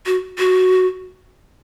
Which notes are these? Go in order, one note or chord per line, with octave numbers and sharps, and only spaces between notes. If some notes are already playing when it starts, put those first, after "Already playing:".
F#4
F#4